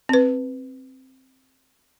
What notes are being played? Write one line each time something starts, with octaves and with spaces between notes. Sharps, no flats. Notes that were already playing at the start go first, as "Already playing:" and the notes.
C4 B4